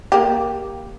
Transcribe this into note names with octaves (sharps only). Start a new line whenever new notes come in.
A#3 G4